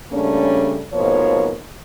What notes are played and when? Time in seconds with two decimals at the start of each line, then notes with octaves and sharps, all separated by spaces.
0.12 C#3 G3 A3 A#3 C#4 D4
0.93 F2 G#2 B2 F3 A#3 C#5